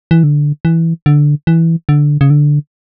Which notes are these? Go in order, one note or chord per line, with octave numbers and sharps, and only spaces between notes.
E3
D3
E3
D3
E3
D3
C#3
D3